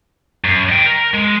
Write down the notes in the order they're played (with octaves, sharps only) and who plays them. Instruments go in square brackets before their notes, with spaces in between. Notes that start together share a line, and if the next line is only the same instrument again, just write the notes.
[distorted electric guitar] F#2
D#5 G5
A#4
G#3